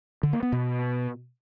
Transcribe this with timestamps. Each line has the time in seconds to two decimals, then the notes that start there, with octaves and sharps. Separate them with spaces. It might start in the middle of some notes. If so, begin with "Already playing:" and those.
0.23 D3
0.33 A#3
0.43 B3
0.52 B2